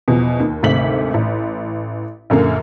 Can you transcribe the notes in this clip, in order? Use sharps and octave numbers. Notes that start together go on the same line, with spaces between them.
E2 B2 F3
D#2
G#1 D2 C3 B6 F#7
A1
A#1 F#2 D3 A#3